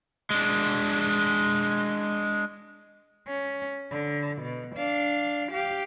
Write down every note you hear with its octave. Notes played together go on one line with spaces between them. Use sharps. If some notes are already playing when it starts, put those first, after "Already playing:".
G#3 D4
C#4
D3
B2
D4 F5
G4 F5